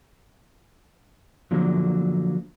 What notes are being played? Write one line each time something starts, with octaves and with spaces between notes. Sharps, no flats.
D3 F3 F#3 A#3